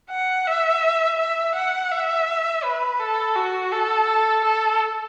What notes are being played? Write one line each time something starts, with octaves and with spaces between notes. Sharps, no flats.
F#5
E5
E5
F#5
E5
B4
A4
F#4
A4
A4